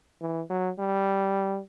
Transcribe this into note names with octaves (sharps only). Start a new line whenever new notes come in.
E3
F#3
G3